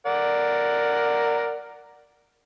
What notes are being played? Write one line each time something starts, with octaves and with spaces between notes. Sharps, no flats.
A#4 D5 F#5